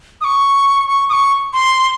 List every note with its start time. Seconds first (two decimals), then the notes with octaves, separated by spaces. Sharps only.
0.21 D#6
0.24 C#6
0.87 C#6
1.09 D#6
1.13 C#6
1.53 C6